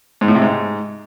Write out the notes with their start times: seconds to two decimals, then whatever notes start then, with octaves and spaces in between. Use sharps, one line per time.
0.21 G#2
0.28 A2
0.35 C3
0.42 G#2